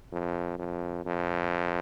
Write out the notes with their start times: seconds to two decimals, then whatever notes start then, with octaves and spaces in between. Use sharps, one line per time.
0.12 F2
0.59 F2
1.06 F2